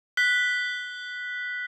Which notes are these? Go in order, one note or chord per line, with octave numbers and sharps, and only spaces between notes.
F#6 B6 G7